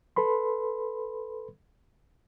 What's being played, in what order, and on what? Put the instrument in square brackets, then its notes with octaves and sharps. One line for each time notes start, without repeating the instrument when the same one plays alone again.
[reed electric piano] A4 B4 B5 C6